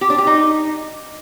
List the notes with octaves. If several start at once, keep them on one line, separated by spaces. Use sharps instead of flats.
G4
D4
G4
D#4